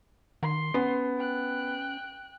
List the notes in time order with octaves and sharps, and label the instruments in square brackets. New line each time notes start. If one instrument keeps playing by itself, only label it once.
[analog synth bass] D#3 [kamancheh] C6
[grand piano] B3 [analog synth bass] C#4
[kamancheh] G5 F#6